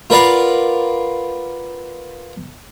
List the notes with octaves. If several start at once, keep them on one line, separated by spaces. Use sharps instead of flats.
F4 A#4 B4 D5 F5 F#5